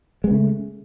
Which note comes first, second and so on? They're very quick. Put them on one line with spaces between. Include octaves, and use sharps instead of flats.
G#3 B3 C#3 A3